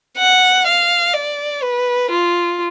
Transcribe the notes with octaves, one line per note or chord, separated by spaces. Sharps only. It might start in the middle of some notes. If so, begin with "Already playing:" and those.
F#5
F5
D5
B4
F4